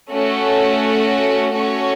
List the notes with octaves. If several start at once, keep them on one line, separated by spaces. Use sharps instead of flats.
A3 C#4 F#4
A3 C#4 F#4 C#5